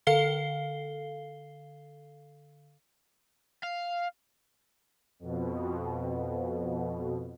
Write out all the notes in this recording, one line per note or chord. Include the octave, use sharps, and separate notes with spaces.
D3 A4 F5 C7 G7
F5
F2 B2